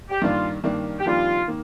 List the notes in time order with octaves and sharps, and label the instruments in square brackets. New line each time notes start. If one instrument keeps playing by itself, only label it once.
[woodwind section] G4
[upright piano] G2 D#3 A#3 D4 [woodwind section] F4
[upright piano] G2 D#3 A#3 D4
[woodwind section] G4
[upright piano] F2 D#3 G3 A#3 D4 [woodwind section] F4
[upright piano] D#3 A#3